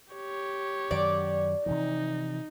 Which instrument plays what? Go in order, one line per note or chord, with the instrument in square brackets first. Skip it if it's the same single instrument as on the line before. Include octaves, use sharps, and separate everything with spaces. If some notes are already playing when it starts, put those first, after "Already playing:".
[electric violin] G4 C#5
[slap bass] F#2 D#3 F#3 [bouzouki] D5
[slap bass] C3 E3 F3 [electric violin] D#4